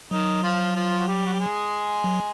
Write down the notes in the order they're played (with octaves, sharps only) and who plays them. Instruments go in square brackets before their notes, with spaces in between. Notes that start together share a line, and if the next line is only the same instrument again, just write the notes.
[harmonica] D#3 D#4 [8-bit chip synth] F#3
[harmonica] F3 F4
F3 F4
F#4
G3 G4
F#4
G4
G#3 G#4
[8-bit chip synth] F#3